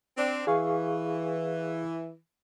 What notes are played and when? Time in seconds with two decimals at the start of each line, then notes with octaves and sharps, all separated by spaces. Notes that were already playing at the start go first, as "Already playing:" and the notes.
0.17 C4 D4
0.47 E3 G#4 F5 C#6